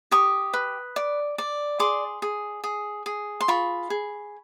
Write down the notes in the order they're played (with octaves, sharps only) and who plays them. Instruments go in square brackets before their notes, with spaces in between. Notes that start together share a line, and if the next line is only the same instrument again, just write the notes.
[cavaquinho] G4 C#6 D#6
B4
D5
D5
G#4 C6 D6
G#4
G#4
G#4
C6
F4 B5 C#6
G#4